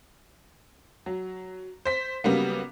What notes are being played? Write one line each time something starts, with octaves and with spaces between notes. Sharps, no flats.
F#3
C5 B6
C#3 F#3 G3 A#3 B3